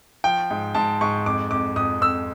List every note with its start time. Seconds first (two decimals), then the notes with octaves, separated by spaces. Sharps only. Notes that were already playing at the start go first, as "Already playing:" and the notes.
0.24 F3 G5
0.50 G#2
0.75 G#2 A5
1.01 G#2 C#6
1.26 F2 D6
1.51 F2 D6
1.76 F2 D#6
2.01 F2 E6